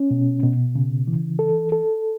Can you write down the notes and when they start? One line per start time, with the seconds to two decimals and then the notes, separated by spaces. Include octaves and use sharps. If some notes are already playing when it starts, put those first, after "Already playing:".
Already playing: C#4
0.11 B2
0.43 B2
0.75 C#3
1.07 E3
1.39 A4
1.72 A4